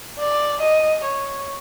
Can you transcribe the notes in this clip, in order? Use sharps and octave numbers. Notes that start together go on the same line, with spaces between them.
D5
D#5
C#5